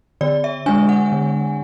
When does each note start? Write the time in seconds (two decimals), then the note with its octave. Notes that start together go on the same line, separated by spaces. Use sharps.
0.21 D3 D5
0.44 E5
0.66 G#3 D4 G#5
0.89 F#5
1.12 D3